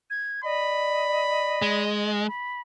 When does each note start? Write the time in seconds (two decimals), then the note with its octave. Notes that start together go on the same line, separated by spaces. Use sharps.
0.10 G#6
0.44 D5 D#5 B5
1.62 G#3
2.28 B5